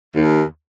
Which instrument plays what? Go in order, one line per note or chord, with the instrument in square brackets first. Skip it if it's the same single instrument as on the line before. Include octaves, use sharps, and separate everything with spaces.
[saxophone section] D#2